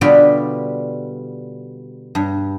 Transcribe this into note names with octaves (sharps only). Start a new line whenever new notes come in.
B2 D3 G3 F4 D5 B5
G2